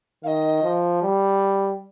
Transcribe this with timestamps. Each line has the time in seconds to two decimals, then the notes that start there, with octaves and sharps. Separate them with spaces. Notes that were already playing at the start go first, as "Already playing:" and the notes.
0.24 D#3 F5
0.27 D#5
0.63 F3
1.02 G3